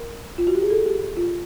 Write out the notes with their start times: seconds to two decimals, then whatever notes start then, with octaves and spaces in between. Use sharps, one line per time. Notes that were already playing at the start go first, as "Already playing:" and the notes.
Already playing: A#4
0.38 F4
0.47 F#4
0.55 G4
0.62 G#4
0.70 A4
0.86 G4
1.17 F4